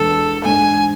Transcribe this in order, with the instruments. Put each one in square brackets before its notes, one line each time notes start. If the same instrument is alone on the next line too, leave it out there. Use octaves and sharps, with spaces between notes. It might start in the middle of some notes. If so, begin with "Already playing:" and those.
Already playing: [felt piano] E2 B2 G#3 D4 [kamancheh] A4
[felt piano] G#2 G#3 D4 [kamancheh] G#5